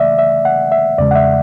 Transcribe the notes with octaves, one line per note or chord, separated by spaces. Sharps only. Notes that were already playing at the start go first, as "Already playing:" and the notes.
Already playing: C#3 E3 A3 D5 E5
E5
F#5
E5
E2 C#3 G#3 D5
F#5
E5